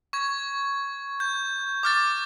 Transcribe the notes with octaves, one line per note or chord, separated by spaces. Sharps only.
C#6 G#6
G6
D6 F6 A6